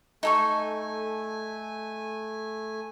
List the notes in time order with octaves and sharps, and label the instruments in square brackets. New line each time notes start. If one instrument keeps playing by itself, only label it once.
[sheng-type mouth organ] A3 G#5 [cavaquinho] D#4 A4 C#6